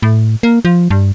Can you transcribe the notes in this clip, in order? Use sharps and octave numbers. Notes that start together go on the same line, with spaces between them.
A2
A#3
F3
G2